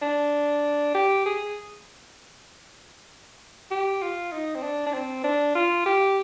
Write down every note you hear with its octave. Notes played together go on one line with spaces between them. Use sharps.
D4
G4
G#4
G4
F4
D#4
C4
D4
D4
C4
D4
F4
G4